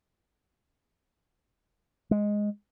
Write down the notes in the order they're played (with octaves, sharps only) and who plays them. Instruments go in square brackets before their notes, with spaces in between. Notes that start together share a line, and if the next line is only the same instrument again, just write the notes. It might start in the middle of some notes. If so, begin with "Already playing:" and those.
[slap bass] G#3